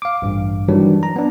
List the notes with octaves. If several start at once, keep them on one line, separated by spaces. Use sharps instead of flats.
F5 D6
A1 G2
D#3 E3 F#3 G3 D4
A#5
B3 D4